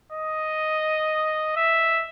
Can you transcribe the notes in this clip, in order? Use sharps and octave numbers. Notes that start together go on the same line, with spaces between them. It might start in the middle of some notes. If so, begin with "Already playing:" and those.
D#5
E5